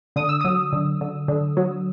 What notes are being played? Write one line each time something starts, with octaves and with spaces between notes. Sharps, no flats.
D3 D#6
E6
F#3 D#6
D3
D3
D3
F#3